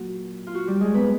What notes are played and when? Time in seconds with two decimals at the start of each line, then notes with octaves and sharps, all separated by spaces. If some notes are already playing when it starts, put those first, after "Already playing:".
Already playing: A#2 F#3 A#3 F#4
0.47 F4
0.55 F#4
0.67 G3 G4
0.81 G#3 G#4
0.94 B3 B4